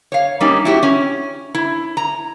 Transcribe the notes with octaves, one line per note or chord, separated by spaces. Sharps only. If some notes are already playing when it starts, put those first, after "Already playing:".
C#5 F5
G3 A#3 C#4 D#4
E4 F#4 G4
C#4
E4
A#5